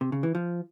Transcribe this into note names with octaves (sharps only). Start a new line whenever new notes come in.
C3
C#3
E3
F3